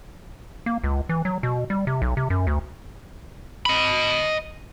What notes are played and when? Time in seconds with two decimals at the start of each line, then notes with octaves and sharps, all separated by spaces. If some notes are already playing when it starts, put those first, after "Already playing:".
0.66 A#3
0.84 C#2
1.09 E3
1.25 F#3
1.43 B2
1.70 G3
1.87 C3
2.02 B1
2.17 C3
2.30 F#2
2.47 D2
3.66 D#5 B5